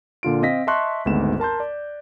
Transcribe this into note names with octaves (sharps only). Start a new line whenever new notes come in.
A#2 D3 F4 D7
C4 D#5 F5 A#6 B6
D#5 E5 A5 C6 C#6 F#6
G#1 D2 G#2 B3 E7
A#4 A5 C6 G6
D5